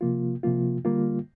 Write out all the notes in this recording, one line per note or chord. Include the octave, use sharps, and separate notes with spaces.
C3 F3 A#3 F4
C3 F3 A#3 F4
D3 G3 A#3 F4